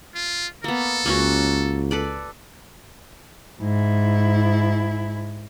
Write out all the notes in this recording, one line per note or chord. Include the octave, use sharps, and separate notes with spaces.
F4
A#3 B3 A4
C#2 A#3 C#4 F#4
A4 B4 D5
G#2 E4